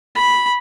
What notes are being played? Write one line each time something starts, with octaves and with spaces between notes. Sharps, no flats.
B5